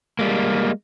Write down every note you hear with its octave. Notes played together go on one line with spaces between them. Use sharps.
G3 G#3 A#3